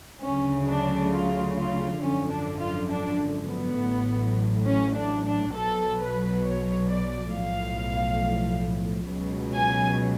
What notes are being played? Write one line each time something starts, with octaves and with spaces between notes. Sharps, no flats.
D2 C#3 F#3 C#4
D4
F4
F4
G#1 F#2 D3 F3 C#4
D4
F4
D4
B3
A1 A2 F#3
C#4
D4
D4
B1 B2 F#3 A4
B4
C#5
D5
B1 A2 F3 F5
C#2 B2 F#3
G#5